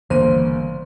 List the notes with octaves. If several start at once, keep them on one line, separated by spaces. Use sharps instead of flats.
G1 C#3 E3 A#3 C5 D#7